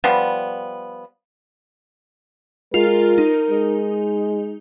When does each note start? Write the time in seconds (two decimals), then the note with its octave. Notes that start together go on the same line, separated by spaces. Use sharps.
0.04 F3 G3 B3
2.74 G#3 F4 A#4
3.18 D#4
3.50 G#3